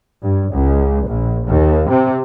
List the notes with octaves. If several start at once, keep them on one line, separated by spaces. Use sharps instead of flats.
G2
C#2
A#1
D#2
C3